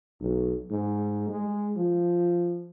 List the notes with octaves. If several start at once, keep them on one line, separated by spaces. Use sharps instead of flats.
B1
G#2
G#3
F3